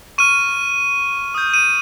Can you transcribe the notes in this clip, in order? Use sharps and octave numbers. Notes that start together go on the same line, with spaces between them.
C#6 F6 D#7
D#6 G6
D#7